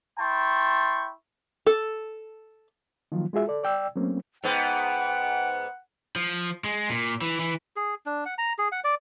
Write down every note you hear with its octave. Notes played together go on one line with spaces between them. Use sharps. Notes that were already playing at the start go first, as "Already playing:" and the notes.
E4 G5 A5 C6 C#6
A4
D#3 F3 F#3 A#3 F4
G#3 F4 F#4 G#4 E5
A4 D5
D5 G5 E6
F#3 A3 A#3 C4 C#4
G#2 B3 F#5 G5
F3
G#3
A#2
E3
E3
G#4
D4
F#5
A#5
G#4
F#5
D5